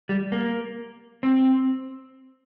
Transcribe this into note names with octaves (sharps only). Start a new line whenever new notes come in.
G3
A#3
C4